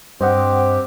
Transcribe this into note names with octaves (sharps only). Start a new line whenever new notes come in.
G2 C4 G4 C5 D#5 F#5